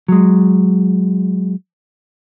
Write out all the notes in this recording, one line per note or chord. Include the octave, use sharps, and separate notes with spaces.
F#3 G#3